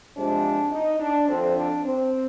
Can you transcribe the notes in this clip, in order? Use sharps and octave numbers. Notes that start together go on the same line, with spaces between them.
C3 F3 G#3 C4 D4
D#4
D4
F2 D3 F3 C4
D4
C4